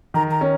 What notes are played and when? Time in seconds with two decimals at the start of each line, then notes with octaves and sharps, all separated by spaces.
0.14 D#3 A#5
0.31 A#5
0.41 C#4